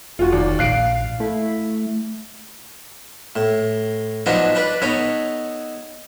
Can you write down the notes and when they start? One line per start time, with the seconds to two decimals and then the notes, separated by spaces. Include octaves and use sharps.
0.19 F1 F4 F#4 G#4
0.32 D#2 D5
0.59 A#1 F5 F#6 C7 D7
1.20 A3 E4
3.36 A2
4.26 F3 F#3 B3 D4 D#4 F#4
4.55 D4 B4 D5
4.82 B3 D#4 A4 C#5